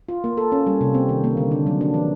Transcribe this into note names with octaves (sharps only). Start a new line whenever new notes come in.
F4
A#3
A4
C#4
G3
C3
C4
D#3
A#3
D3
D4
F#3
D4
E3